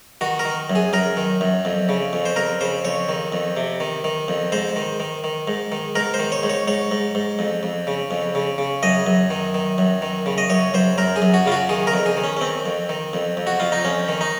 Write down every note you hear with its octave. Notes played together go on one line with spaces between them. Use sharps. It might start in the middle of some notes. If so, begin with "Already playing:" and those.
D#3 F#4
A#4
D#3
F#2
G#4
F#2 A#4
D#3
F#2
F2
C#3
F2
C5
F2 A#4
C#3 C5
F2 C#5
D#3
F2
C3
D#3
D#3
F2
G#2 C5
D#3
D#3
D#3
G#2
D#3
G#2 A#4
C5
D#3
C#5
G#2
C#5
G#2 C#5
G#2
G#2
F2
F2
C#3
F2
C#3
C#3
F#2 D#5
F#2
D#3
D#3
F#2
D#3
C#3
D#5
F#2 C#5
F#2 C5
F#2 A#4
G#4
F#2
F#4
C#3 F4
F#4
D#3 G#4
A#4
F2
G#4
D#3
C#4
C#4
D#3 C4
F2
D#3
F2
F2
F#4
F2 F4
D#4
F2 C#4
D#3
D#4